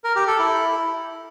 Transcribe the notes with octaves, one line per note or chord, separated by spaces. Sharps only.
A#4
G4
A4
E4